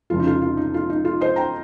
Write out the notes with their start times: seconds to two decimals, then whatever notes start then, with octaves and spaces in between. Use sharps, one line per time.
0.10 F1 F2 C#3 F4
0.20 D#4
0.27 F4
0.42 F4
0.57 D#4
0.74 F4
0.90 D#4
1.05 F4
1.21 C5 D#5
1.36 G5 A#5